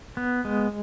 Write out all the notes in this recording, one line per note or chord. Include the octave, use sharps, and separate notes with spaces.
B3
G#3